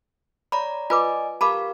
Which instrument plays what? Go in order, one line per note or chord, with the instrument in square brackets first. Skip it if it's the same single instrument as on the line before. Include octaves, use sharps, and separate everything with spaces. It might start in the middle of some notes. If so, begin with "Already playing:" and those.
[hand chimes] C#5 D5 A#5 [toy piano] B5
[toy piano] F4 B4 D6 [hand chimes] D5 D#5 G#5
[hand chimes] G4 A#4 F5 [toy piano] A5 B5 D6